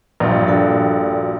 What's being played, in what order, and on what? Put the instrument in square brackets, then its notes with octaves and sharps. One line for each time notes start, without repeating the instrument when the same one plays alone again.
[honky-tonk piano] A#1 G2
[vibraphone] F#4 A4 G5